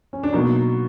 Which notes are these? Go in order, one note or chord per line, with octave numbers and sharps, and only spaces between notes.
C#4
D4
B2 F#3 A#3 D#4